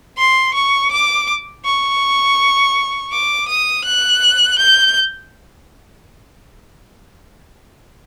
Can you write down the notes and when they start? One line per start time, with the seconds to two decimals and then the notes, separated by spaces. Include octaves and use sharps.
0.18 C6
0.54 C#6
0.91 D6
1.65 C#6
3.12 D6
3.48 D#6
3.85 F#6
4.59 G6